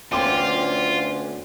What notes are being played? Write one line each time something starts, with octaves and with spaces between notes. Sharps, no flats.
D2 B3 C#4 D4 F4 G5 C6 D6